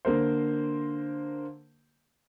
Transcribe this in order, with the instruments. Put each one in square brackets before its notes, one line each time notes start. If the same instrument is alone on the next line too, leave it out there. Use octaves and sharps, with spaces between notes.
[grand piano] D3 A#3 A#4 C5